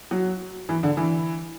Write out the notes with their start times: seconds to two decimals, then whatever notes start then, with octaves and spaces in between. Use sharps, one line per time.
0.11 F#3
0.69 E3
0.83 D3
0.97 E3